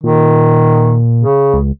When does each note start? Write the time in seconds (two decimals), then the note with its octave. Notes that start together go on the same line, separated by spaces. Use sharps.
0.04 A#2 D#3
1.22 C#3
1.54 C#2